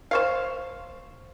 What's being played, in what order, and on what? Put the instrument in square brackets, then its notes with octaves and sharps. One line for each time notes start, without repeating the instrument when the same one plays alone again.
[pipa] C5 C#5 F5